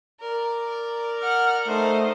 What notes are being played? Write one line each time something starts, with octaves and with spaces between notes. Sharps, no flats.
A#4 D5
F#5 F6
A3 D#4 C5